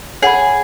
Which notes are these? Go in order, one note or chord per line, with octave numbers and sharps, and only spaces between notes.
G#4 C#5 F#5 B5